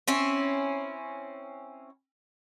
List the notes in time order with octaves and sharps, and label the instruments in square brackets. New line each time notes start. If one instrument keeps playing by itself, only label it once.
[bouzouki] C4 C#4 E4